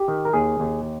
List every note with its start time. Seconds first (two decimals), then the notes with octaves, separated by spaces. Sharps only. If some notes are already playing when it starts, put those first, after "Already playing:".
Already playing: G4
0.08 D#3
0.25 A#4
0.33 D#2 G#4
0.60 D#2